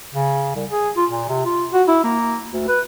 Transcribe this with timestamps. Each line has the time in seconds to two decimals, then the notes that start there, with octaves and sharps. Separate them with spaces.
0.14 C#3
0.55 C2
0.71 G#4
0.97 F4
1.10 A#2
1.29 C3
1.46 F4
1.73 F#4
1.88 E4
2.04 A#3
2.53 D2
2.68 B4